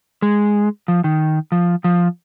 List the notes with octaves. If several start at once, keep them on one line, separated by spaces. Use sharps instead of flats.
G#3
F3
D#3
F3
F3